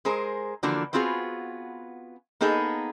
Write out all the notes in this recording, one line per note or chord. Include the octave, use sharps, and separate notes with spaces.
G#3 G#4 A#4 C5
D3 E3 F3 A#3 D4 F#4
B3 C4 F4 F#4 G#4
A#3 B3 D#4 G#4 A4